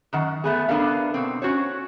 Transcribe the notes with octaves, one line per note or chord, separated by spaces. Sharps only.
F#2 D#3 F#5
A3 B3 G#4
B3 D4 A4 A#4 F5
B2 C4
C#4 F#4 C5 C#5